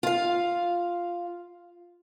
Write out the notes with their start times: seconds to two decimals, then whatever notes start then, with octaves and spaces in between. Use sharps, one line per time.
0.03 F4 F5